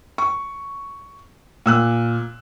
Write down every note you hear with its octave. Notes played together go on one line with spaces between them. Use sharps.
C#6
A#2 E6 F#6